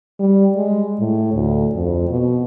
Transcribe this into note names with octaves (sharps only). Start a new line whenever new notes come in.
G3
G#3
A2
D2
F2
B2